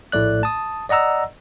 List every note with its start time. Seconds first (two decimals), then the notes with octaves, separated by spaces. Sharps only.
0.12 A#1 A2 A3 D5 F#6
0.43 A5 D#6
0.89 D5 D#5 F#5 A#5 E6